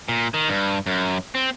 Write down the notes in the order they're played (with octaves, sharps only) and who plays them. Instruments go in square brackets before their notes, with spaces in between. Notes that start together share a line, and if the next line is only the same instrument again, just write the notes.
[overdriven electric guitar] A#2
D#3
G2
F#2
C4